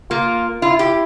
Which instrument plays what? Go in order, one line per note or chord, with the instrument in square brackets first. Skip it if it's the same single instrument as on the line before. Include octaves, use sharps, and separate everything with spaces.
[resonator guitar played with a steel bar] A#3 [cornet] F4
[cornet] E4 [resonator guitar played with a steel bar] F4
[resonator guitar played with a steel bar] G4